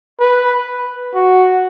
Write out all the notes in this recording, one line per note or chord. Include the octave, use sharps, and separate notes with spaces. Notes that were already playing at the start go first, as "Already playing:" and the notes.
B4
F#4